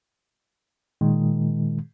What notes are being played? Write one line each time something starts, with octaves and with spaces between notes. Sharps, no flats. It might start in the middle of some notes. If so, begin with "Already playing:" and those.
A#2 D#3 G#3